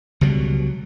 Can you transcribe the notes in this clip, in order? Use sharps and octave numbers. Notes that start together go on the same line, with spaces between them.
C#2 B2 F#3 G3